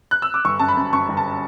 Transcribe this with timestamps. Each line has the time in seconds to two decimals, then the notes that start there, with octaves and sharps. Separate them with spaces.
0.11 F#6
0.22 E6
0.34 D6
0.45 G1 C#6
0.59 F#2 A5
0.68 B5
0.77 F#2
0.93 F#2 C#6
1.09 G1
1.17 A5